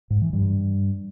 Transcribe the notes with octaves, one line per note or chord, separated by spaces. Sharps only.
G#2
E3
G2